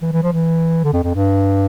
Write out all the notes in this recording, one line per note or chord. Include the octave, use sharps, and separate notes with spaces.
E3
E3
F3
E3
D3
F2
F2
G2